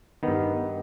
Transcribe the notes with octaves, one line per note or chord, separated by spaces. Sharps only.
G2 D#3 B3